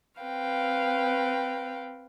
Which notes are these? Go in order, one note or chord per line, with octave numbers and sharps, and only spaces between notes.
C4 B4 F5 G5